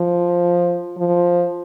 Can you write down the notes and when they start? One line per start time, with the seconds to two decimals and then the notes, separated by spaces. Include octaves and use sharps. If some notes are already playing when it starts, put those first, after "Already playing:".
Already playing: F3
0.98 F3